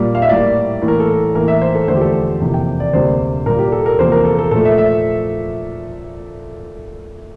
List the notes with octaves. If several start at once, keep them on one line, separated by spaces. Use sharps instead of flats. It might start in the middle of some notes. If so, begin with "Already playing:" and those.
Already playing: A#2 G3 A#3
F5
E5
A2 G3 A#3 D5
A2 E3 A#3
A#4
A4
A2 E3 A#3 A#4
E5
C5
A4
E2 D3 F3 A3 C5
G4
A4
F2 C3 E3 A#3
G5
D5
D2 C3 G3 A#3 C5
A#2 G3 A#3 A#4
G4
A4
A#4
E2 C3 F3 A#3 C5
A#4
A4
A4
A#2 F3 A3 A4
E5
E5